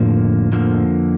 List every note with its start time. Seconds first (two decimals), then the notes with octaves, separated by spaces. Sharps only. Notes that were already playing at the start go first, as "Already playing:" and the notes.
Already playing: F2 A2 D3 F3 A#3
0.52 F2 D3 F3 A#3